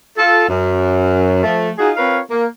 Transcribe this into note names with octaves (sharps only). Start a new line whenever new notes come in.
F4 A4
F#2
F3 A3
D#4 F4 F#4 G#4
C4 F4 A#4 B4 C#5 F5
A#3